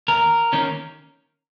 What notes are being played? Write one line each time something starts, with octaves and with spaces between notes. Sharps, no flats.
D#2 A#4
D#3 A#3 C#4